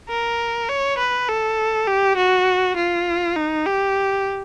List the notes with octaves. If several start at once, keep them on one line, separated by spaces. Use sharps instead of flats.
A#4
C#5
B4
A4
G4
F#4
F4
D#4
G4